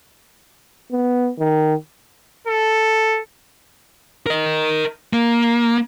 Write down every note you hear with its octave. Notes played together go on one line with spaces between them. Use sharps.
B3
D#3
A4
A#4 D#5
A#3